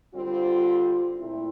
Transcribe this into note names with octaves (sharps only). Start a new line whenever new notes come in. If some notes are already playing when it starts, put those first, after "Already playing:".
D3 G3 C4 F4
A#2 A3 C4 E4